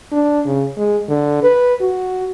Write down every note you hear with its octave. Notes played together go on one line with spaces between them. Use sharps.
D4
C#3
G#3
D3
B4
F#4